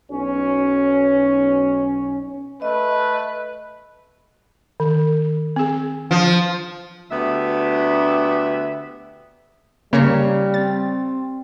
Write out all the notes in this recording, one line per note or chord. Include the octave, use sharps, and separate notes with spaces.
B1 C#4
A3 B4 D#5
D#3
C4 G#4
F3
D2 B3 G4 E5
C#3 G3 A#3 C#5 A#5
C4 A6